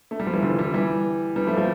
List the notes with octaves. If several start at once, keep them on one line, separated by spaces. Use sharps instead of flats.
A3
G3
F3
E3 G3
D3 F3
E3 G3
E3 G3
G3 B3
F3 A3
F3 A3